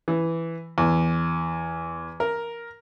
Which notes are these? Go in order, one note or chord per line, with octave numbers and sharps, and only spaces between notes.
E3
E2
A#4